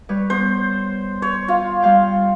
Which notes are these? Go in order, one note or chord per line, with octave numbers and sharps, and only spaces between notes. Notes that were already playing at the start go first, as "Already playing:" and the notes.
G3 B4 C#5
B3 C5
C#5
F4
G3 F5 G5